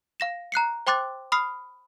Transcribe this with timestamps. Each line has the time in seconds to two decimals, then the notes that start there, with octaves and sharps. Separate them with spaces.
0.20 F5 A#6 E7
0.52 A#5 F#6 C7 C#7
0.87 C5 G5 C6 D6 F#6 A6
1.32 B5 D#6 F6 C7